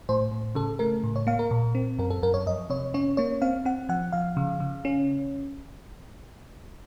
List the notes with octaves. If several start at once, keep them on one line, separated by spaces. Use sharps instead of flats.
A2 C5
A2
C#3 A4
A3 A#4
A2
C#5
A#3 F5
A#4
A#2
C4
F#2 A#4
A4
F#2 A#4
C#5
F2 D#5
C3 C#5
C#4 C#5
A#3 C#5
C4 F5
C4 F#5
F3 F#5
F3 F5
C#3
C#3
C#4